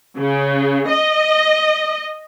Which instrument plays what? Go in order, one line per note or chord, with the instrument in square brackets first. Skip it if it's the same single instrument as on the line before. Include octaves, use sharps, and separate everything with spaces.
[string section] C#3
D#5